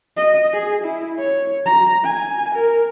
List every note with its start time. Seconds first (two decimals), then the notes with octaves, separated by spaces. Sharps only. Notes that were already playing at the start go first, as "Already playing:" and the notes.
0.17 D#5
0.54 G#4
0.84 E4
1.18 C#5
1.66 A#5
2.04 G#5
2.55 A#4